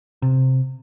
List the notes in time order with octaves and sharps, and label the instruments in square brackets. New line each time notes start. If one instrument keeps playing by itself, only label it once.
[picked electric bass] C3